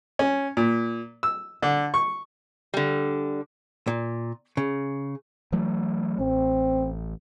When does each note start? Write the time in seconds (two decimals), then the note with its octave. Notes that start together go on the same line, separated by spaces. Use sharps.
0.19 C#4
0.57 A#2
1.23 E6
1.62 D3
1.94 C#6
2.74 D3 G3
3.87 A#2
4.57 C#3
5.52 E3 F#3 A3
6.19 A1 C4